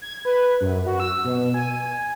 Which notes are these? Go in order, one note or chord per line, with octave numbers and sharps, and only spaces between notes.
G#6
B4
F#2
F#4
E6
B2
G#5